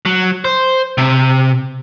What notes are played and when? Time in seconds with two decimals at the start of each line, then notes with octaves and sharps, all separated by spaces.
0.05 F#3
0.45 C5
0.98 C3